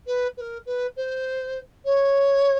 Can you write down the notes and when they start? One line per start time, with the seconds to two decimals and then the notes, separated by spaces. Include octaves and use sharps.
0.07 B4
0.37 B4
0.41 A#4
0.66 B4
0.97 C5
1.85 C#5